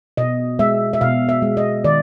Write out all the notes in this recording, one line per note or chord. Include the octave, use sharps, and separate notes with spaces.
B2 D#5
G#3 E5
E5
B2 F5
E5
G#3
D#5
D#3 D5